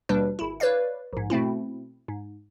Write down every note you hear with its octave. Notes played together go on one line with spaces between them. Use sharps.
D#2 B2 G3 D4 B4
G#1 E4
B4 C#5 D5 F5
A#1 G#2
B2 A3 C4 E4
G#2